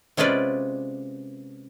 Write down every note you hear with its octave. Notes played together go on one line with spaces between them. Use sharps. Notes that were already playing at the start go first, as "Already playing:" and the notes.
C3 G#3 C#4 F4 B4 D5